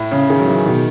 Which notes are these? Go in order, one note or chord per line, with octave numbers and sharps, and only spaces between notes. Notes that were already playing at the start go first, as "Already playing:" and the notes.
Already playing: A2
C#3 C#4
D#3 G#4
F#3
E3 G#4
B2 D#3